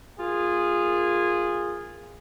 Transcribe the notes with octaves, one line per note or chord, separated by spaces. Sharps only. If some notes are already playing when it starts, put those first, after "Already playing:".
A#3 F4 G#4